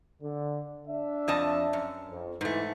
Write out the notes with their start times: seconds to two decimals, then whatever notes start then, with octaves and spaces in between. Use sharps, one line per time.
0.22 D3
0.88 D4 E5
1.28 F2 D#5 A5
1.73 F#2
2.10 F2
2.41 G#2 E3 A3